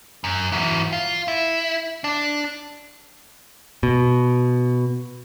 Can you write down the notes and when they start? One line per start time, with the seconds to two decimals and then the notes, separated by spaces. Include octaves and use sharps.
0.24 F#2
0.52 E3 F#3
0.93 F4
1.28 E4
2.04 D4
3.83 B2